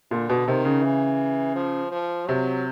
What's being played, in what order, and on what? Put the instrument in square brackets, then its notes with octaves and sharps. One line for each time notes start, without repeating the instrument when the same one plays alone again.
[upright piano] A#2 [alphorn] D3
[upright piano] B2
[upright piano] C3 [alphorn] D#3
[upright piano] C#3
[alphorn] E3
F3
F3
[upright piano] C3 [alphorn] F#3